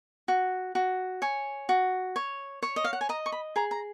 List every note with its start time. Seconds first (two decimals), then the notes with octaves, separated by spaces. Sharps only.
0.28 F#4
0.75 F#4
1.22 C#5 G#5
1.69 F#4
2.16 C#5
2.62 C#5
2.76 D#5
2.84 F5
2.93 F#5
3.01 G#5
3.09 D#5 A#5
3.26 C#6
3.32 B5
3.56 G#4 A#5
3.71 A#5